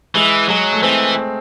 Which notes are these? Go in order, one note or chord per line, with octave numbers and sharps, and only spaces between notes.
E3 G#3
F#3 G#3
A3
E3 C4